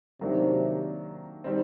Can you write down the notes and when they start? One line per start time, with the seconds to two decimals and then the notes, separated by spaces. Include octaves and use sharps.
0.21 C3 D#3 F#3 A#3 D4
1.44 D#3 G3 C4